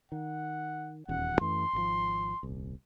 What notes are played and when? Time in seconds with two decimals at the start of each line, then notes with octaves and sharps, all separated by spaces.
0.12 D#3 F#5
1.08 D#1 E2 C#4 F#5
1.41 F#2 E3 A3 C6
1.73 G#1 C3 F3
2.43 D#1 C2